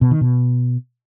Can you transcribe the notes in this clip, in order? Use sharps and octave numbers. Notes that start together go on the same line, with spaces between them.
B2
D#3
B2